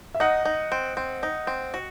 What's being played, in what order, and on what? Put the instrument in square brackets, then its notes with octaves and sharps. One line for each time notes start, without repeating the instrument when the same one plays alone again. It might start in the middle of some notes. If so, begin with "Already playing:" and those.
[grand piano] E5
[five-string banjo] D#4 [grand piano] D#5 F#5
[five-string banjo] D#4
C4
C4
D#4
C4
F#4